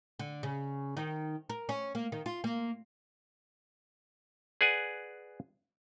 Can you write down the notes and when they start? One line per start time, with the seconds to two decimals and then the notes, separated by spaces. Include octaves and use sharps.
0.19 D3
0.43 C#3
0.97 D#3
1.49 A#4
1.69 C#4
1.95 A#3
2.12 D#3
2.26 F4
2.44 A#3
4.61 G#4 B4 D5 F#5 G#5